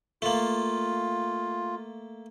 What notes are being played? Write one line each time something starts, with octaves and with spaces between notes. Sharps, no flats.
A3 A#3 F4